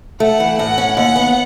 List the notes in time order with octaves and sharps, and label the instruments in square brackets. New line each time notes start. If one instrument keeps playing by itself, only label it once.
[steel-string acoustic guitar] A3 [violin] F#5
[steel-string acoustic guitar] E3
[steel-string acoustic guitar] A2 [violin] F#5
[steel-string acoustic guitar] C#4
[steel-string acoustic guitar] D#2 [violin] F#5
[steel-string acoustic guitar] B3